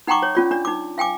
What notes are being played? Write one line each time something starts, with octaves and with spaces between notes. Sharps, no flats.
D#4 F#5 G5 A#5 C#6 D6
C#5
C#4 F4 D5
D4 D5
D#4 D6
F5 G5 G#5 D6